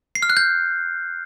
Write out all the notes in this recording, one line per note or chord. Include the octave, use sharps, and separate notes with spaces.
C7
F6
F#6
G6